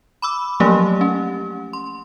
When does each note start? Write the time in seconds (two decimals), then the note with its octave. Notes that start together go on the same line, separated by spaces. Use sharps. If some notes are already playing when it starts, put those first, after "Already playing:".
0.22 B5 D6 E6
0.60 F3 F#3 A3 A#3 C#4 G4
1.01 C#4
1.73 C6